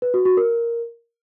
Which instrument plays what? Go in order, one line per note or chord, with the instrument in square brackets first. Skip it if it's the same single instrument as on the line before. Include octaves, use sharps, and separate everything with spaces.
[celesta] B4
F#4
F#4
A#4